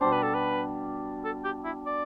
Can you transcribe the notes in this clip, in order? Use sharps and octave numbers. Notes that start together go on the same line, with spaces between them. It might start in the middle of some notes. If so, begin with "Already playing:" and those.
B2 G3 D4 C5
B4
A4
B4
A4
G4
E4
D5